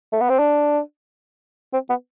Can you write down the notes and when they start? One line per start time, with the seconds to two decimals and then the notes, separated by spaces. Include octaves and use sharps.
0.13 A3
0.21 B3
0.30 C4
0.39 D4
1.73 C4
1.90 B3